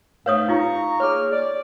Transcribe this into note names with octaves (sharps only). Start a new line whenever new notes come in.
G#2 A3 B4 C#5 F5 D#6
D#4 F4 G4 A#5 C#6
A#3 G#4 C#5 D6 F6
D5